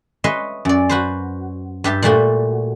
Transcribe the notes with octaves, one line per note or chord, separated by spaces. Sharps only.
B4 C#5 D#5 E5 G#5 C6
F#2 D5
F#4 B4 C5
G2 G4 E5 A5
A#2 G3 A3 F#4